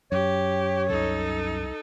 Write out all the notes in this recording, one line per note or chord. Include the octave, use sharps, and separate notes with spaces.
F#2 G4 C#5
C2 D#4 A4